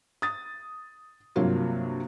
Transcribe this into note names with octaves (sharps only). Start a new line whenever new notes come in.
D#6 A6
G2 C3 F#3 A#3 F4 F#4